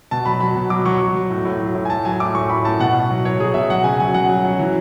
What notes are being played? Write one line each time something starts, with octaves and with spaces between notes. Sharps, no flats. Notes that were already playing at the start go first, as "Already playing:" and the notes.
B2 A5
F#3 B5
F#3 B5
B2
F#3 D6
F#3 C#6
F#3
F#3
A2
A2
F#3
A2
G#5
A2 A5
F#3 G#5
A2 D6
A2 C#6
A2 B5
A2 A5
B2 F#5
B2
F#3
F#3 C#5
F#3 G#4
B2 E5
F#3 F#5
C#3 G#5
F#3 G#5
F#3 F#5
F#3
F#3
E3